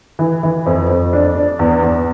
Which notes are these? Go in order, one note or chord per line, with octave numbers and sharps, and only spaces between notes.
E3
E3
F2
F2
D4
D4
E2
E2